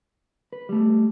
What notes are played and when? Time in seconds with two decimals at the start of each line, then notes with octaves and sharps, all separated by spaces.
0.53 B4
0.69 G3 A3